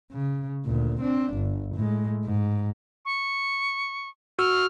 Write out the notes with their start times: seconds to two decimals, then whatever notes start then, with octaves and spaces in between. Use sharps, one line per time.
0.12 C#3
0.65 D2 A#2
1.01 C4 D4
1.34 G1
1.75 A2 G#3
2.25 G#2
3.05 C#6
4.39 F#4 C#6 E6 F6